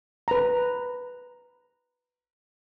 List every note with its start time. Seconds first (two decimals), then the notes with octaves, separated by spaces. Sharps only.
0.28 B4 A#5